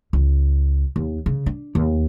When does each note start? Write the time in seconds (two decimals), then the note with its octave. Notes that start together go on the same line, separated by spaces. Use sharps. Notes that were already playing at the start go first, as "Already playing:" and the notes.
0.13 C#2
0.96 D#2
1.26 C#3
1.46 D4
1.75 D#2